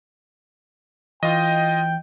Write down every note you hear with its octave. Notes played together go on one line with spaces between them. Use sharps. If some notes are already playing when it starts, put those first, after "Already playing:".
E3 F4 D#5 G5